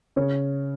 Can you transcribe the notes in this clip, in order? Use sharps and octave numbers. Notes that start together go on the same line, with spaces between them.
C#3 C#5